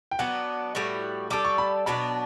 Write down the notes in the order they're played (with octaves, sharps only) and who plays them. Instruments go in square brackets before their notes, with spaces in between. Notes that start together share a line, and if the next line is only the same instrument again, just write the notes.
[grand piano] G5
[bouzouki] F#3 B3 D4 [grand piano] F#5
[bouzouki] A2 G3 B3 F#4
[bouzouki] G3 D4 A4 [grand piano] D6
[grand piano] C#6
B5
[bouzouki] B2 F#3 B3 D4 [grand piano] B5